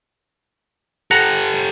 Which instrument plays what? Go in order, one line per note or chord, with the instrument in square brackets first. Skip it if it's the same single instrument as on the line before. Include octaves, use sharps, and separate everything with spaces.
[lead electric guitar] G4 A4 [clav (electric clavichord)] F#5 A#5